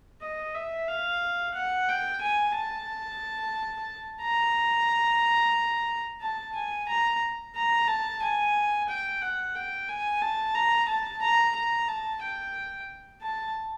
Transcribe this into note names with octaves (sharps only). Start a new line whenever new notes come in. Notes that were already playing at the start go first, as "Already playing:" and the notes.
D#5
E5
F5
F#5
G5
G#5
A5
A#5
A5
G#5
A#5
A#5
A5
G#5
G5
F#5
G5
G#5
A5
A#5
A5
A#5
A#5
A5
G5
A5